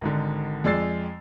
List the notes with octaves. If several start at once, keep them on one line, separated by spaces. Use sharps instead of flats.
G#1 G#2 D3
F2 G#3 D5 E6 A6 C7